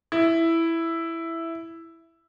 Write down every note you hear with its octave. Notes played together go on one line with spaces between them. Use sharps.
E4